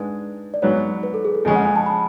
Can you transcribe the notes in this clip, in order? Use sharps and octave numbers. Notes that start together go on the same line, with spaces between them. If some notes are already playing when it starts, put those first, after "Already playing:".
Already playing: G#2 G#3 D4 B4
D5
G#2 F#3 B3 C#5
B4
A4
G#4
A4
F2 C#3 G#3 C#4 G#4
F#5
G#5
A5
B5